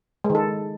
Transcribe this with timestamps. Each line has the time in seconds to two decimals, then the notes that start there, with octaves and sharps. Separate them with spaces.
0.24 G#3
0.30 D#3
0.35 A4